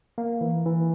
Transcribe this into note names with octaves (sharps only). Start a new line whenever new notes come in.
A#3
E3
E3